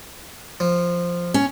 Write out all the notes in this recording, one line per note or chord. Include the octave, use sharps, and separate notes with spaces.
F3
C#4